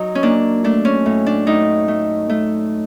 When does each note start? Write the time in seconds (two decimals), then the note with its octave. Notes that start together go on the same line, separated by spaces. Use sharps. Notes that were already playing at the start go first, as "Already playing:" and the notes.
Already playing: F#3 D#4
0.15 C#4
0.23 A#3 D4
0.64 A3 D4
0.85 C#4
1.06 A2
1.26 D4
1.47 A2 D#4
1.88 A3
2.29 A3